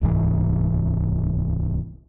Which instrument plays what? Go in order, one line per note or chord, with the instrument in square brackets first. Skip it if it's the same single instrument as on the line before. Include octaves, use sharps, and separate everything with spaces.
[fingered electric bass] D1 C2 G#2 E3